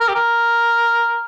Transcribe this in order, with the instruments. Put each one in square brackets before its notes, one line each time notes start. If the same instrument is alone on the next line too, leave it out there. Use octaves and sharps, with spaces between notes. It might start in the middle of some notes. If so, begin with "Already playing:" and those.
[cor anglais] A#4
G4
A#4